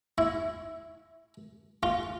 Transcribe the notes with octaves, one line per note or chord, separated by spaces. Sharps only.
E4
F4